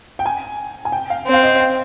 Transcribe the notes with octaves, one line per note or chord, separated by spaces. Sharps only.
G5
G#5
G#5
G5
F5
C4
F5
D#5
G5